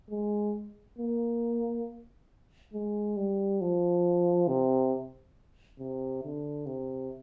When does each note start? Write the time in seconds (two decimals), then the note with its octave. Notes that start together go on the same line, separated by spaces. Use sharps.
0.11 G#3
0.98 A#3
2.73 G#3
3.17 G3
3.61 F3
4.48 C3
5.79 C3
6.24 D3
6.66 C3